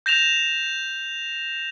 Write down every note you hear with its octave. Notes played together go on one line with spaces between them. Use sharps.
G6 A#6 E7 F7